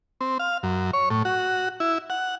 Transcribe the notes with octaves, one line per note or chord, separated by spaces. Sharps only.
C4
F5
F#2
C#5
A2
F#4
E4
F#5